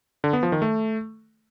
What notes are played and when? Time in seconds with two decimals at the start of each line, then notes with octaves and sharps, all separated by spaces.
0.24 D3
0.33 B3
0.43 F3
0.52 D#3
0.62 A3